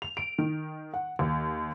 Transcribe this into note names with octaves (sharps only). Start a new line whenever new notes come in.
F7
D7
D#3
F#5
D#2